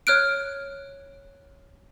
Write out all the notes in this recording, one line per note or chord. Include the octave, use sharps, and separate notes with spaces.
C#5 F6 F#6 D7